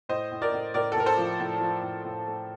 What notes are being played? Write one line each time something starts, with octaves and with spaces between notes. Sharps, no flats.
A2 C5 D#5
A2
A#4 D5
A2
A2 A#4 D5
A4
A2 A#4
A4 C5
F3
A2
F3
A2
A2
A3